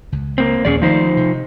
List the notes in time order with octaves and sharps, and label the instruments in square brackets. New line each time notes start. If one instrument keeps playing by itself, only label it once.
[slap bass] C#2
[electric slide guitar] A#3 C4
[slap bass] A#1 D#2 A#3 [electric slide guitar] C#4 G#4 D5
[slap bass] D#3 F#3 A3 [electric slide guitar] F3 D#4 C5
[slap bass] C3